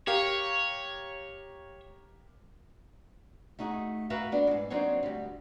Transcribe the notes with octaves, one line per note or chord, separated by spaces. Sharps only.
G4 A#4 C#5 F5
A3 D#4 F#4 G#4
F#4 A#4 B4 E5 F5
B3 D4
F2 G#2
F#3 C4 D4 D#4 C5 C#5
D2 G3